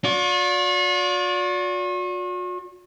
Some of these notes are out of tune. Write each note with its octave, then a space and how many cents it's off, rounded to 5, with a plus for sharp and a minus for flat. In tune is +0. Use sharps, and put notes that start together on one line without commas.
F#4 -45 D5 -25